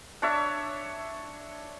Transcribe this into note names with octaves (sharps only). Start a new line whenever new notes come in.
D4 C#5 E5